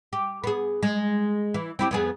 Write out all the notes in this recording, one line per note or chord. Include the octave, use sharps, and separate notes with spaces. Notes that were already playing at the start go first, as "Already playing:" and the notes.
G4
B3 G#4
G#3
E3
C4 E4 G4
F2 B3 G#4